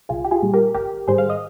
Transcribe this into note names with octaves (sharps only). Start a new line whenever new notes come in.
C2 F4 G#4
G4
F4 G#4
A#2 G3
G4 A#4
G#1 G4 A#4
G#2 D#3 G3 G#4 C5
F5
D#5